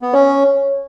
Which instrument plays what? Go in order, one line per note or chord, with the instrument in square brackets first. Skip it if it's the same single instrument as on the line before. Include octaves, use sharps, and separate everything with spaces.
[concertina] B3
[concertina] C#4 [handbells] C#5